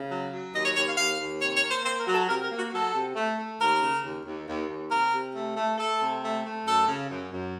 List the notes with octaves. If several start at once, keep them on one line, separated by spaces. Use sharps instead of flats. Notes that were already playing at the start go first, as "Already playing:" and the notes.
Already playing: C#3
F#3
F#3
D#2 D#5
C#5
D#2 C#5
F5
D#2 F5
D#2
C3 C#5
C#5
A#3
C5
A#3 C5
A#4
F#3
A4
C3 A#4
A#4
A#3
F#4
F#3 A4
C3
A3
A3
D#2 A#4
C#3
D#2
D#2
D#2
D#2
C3 A#4
C3
A3
A3
A3 A4
C3
A3
A3
F#2 A4
C#3
F#2
F#2